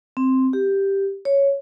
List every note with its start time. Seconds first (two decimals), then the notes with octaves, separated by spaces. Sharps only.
0.17 C4
0.53 G4
1.25 C#5